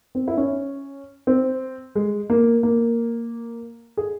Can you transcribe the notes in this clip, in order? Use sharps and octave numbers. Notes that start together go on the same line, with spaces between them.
C4
E4
C#4
C4
G#3
A#3
A#3
G#4